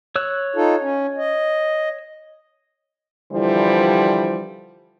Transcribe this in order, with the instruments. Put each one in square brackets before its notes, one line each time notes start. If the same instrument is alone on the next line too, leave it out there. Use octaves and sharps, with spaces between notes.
[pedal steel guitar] C#5 E6 F#6
[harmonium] D#4 F4 A4
C#4
D#5
[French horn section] D3 E3 F3 G3 E4 C5